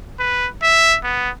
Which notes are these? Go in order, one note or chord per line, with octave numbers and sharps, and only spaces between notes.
B4
E5
B3